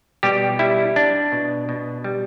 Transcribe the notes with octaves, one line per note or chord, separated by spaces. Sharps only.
B2 G3 G4
G3 E4
D4
B2
B2
G3